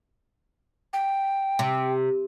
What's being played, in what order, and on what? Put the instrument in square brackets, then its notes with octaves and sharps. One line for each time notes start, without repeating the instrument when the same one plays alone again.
[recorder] G5
[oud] C3